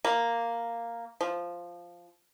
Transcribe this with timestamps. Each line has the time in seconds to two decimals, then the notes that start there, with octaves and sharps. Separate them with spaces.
0.05 A#3
1.21 F3